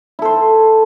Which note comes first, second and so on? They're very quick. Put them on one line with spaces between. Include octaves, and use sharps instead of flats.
E4 A4 C5